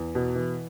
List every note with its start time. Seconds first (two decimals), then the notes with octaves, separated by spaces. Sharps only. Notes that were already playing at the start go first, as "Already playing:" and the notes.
Already playing: E2
0.15 B2
0.35 E3